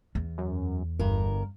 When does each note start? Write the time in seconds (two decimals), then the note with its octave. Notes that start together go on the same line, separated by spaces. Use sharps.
0.15 E2
0.38 F#2
0.99 G1 G2 A#4